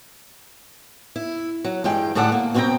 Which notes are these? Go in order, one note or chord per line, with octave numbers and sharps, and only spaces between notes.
E4
F#3
G2 E3 G#3 G5
A2 D3 G#4 A4 D5 F#5
A#3
F#2 B2 C4 F4 G5 A#5